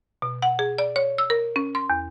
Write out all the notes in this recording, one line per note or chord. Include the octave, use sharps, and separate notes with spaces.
B2
F#5
G#4
D5
C#5
E6
A#4
C#4
C6
E2